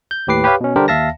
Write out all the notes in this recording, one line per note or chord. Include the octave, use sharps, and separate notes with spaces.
G6
D#2 A2 G4 B4 D6 C7
G4 B4 C#5 F5
B2 C#4
D3 G3 D4 G4 A#4 C5
D#2 E5 F5 A5 A#6